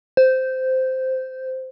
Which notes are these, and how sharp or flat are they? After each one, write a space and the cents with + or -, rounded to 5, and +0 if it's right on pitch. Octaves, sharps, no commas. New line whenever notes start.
C5 -10